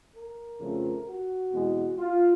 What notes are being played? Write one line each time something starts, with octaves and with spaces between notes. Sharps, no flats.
A#4
F2 C#3 F3 A3 C4
F#4
E2 B2 G#3 C4
F4